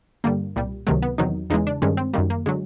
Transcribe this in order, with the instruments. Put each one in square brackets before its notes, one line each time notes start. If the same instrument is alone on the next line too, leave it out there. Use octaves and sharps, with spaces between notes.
[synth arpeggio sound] G2 D3 G3 A#3
C2 A#2 G3
C#2 C3 D#3 F#3 A3
B3
E2 C3 D#3 F#3 D#4
E2 C#3 E3 G#3 D#4
D4
G2 D#3 G#3 C#4
C4
F#2 D#3 G3 A#3
A#3
D3 F#3 G#3